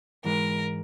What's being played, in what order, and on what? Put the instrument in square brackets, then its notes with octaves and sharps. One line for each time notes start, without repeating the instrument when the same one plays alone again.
[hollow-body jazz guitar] G#2 E3 G#3 [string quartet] A#4